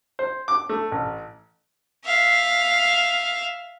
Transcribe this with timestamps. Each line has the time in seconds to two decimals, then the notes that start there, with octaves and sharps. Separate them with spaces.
0.19 C5
0.48 D6
0.69 A3
0.92 A1
2.05 E5 F5